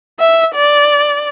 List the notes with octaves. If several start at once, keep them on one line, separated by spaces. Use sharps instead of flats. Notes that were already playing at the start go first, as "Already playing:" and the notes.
E5
D5